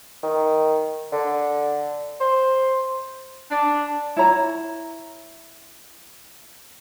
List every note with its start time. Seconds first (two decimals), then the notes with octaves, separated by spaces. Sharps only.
0.23 D#3
1.12 D3
2.20 C5
3.50 D4
4.17 E4 C#5 A#5